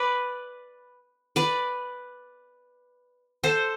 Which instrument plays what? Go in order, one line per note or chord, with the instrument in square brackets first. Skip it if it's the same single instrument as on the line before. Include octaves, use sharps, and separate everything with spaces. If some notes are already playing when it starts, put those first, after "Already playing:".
Already playing: [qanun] B4 D5
B4 D5
A4 C5